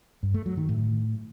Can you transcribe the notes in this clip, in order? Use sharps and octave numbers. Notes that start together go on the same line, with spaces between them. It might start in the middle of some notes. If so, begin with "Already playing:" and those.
G2
A3
F#3
D#3
A2